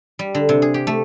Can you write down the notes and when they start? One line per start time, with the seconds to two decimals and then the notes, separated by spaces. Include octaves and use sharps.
0.19 G3
0.35 D3
0.49 C3
0.62 G#4
0.74 G4
0.87 A3